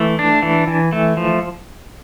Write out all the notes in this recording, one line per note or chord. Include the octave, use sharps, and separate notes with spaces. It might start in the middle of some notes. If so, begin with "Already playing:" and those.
Already playing: E3 A3
D4
E3
E3
A3
F3